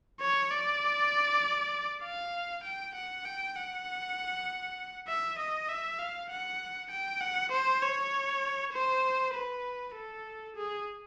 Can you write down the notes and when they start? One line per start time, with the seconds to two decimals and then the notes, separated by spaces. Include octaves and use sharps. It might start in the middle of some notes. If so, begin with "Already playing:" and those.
0.20 C#5
0.51 D5
2.03 F5
2.64 G5
2.95 F#5
3.25 G5
3.56 F#5
5.07 E5
5.38 D#5
5.69 E5
5.99 F5
6.30 F#5
6.90 G5
7.21 F#5
7.51 C5
7.82 C#5
8.73 C5
9.34 B4
9.95 A4
10.56 G#4